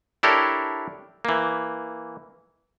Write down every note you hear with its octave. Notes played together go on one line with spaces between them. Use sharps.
D4 E4 G4 A4 A#4 C#5
E3 A#3